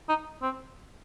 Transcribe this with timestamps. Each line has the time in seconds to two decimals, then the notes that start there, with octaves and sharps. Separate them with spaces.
0.09 D#4
0.42 C4